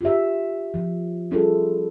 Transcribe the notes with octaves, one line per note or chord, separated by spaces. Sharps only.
F4 G4 E5
F3
G3 C#4 E4 F4 G#4 A4